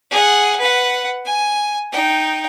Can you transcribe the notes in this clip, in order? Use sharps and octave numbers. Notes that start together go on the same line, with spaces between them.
G#4 F#5
B4 F#5
G#5
D#4 G5